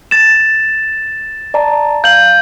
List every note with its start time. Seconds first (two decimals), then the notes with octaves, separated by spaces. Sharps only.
0.11 A6 E7
1.54 D5 A5 A#5
2.04 F5 G6 F#7